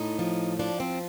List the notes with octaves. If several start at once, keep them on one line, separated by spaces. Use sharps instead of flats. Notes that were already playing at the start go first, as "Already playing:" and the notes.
Already playing: A2 D#4
F3
F3 D4
C4